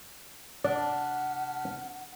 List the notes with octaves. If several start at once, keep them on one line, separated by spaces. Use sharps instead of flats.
C3 D4 D5 F#5 A5 F6